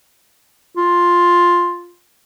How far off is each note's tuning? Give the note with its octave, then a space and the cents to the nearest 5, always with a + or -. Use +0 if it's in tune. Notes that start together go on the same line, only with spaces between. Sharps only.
F4 +5